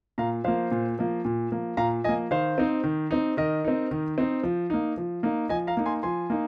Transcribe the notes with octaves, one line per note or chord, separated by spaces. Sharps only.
A#2 F5 A#5
F3 A#3 C5 F5
A#2
F3 A#3
A#2
F3 A#3
A#2 F5 A#5
F3 A#3 D#5 G#5
D#3 C5 F5
C4 D#4
D#3
C4 D#4
D#3 A#4 D#5
C4 D#4
D#3
C4 D#4
F3
A#3 D#4
F3
A#3 D#4
F3 D#5 G#5
F5 A#5
A#3 D#4
G#5 C6
F3 G#5 C6
A#3 D#4